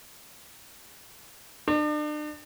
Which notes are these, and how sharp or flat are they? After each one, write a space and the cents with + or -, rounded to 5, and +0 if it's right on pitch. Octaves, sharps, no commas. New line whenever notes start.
D4 +40